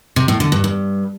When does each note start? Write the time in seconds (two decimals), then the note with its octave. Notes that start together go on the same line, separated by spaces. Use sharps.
0.16 C3
0.28 A2
0.40 D3
0.52 G2
0.64 G2